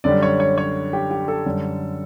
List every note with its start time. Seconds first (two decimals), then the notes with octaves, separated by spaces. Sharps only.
0.04 F#2 D3 G3 D5
0.23 C#5
0.40 C#5
0.58 C#5
0.93 G4
1.11 G4
1.28 A4
1.45 F#2 D3 G3